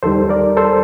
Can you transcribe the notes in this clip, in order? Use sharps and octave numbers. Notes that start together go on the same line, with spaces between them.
D#2 D#3 G3 A4 C5
A#4 D5
A4 C5